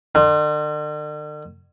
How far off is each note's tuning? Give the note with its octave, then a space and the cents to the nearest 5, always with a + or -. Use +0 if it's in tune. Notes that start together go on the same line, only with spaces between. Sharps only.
D3 +45